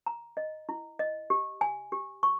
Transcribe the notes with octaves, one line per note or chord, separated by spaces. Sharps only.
A#5
D#5
E4
D#5
G4
G#5
G4
C#6